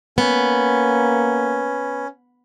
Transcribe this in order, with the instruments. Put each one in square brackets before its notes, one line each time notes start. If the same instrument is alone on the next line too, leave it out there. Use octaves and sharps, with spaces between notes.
[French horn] A#3 [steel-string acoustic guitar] B3 [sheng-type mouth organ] C#4